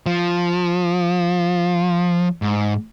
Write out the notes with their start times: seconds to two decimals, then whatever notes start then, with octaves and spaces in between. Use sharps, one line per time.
0.06 F3
2.42 G#2